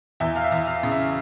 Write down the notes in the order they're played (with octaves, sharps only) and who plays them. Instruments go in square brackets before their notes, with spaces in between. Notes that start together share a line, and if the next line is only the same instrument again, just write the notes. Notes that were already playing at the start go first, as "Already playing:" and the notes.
[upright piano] E2 E5
F5
E5
E2
F5
C#3
E5